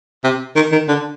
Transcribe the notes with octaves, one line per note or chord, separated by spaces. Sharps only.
C3
D#3
D#3
D3